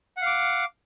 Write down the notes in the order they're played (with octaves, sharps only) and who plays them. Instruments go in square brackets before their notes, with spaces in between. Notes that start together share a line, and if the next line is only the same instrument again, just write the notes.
[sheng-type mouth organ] F#5
F5
D6